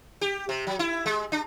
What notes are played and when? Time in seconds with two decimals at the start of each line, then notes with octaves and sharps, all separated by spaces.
0.21 G4
0.49 C3
0.67 F#3
0.79 E4
1.06 G#3
1.32 D4